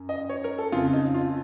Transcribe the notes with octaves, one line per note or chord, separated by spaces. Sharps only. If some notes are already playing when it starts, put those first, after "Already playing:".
Already playing: F#2
D#5
C#5
A#4
A4
F2 C#3 F4
D#4
F4